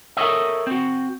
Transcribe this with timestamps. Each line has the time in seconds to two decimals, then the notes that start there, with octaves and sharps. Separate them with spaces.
0.17 A4 A#4 C#5 D#5 E5
0.67 C4 F#4